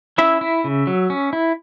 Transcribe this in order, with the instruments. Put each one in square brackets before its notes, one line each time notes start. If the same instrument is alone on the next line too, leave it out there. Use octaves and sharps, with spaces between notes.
[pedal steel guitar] C#4 E4 E5
E4
C#3
F#3
C#4
E4